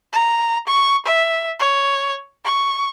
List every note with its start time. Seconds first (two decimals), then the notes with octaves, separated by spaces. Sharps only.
0.13 A#5
0.67 C#6
1.06 E5
1.60 C#5
2.44 C#6